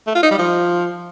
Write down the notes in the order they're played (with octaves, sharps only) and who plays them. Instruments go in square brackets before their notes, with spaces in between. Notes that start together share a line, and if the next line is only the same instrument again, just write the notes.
[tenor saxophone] A3
F4
D#4
G3
F3